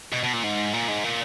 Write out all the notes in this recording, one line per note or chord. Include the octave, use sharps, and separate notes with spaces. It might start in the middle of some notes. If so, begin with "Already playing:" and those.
B2
B2
A#2
G#2
A#2
G#2
A#2